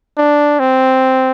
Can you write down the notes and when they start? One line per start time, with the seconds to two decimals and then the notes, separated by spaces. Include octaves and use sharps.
0.17 D4
0.60 C4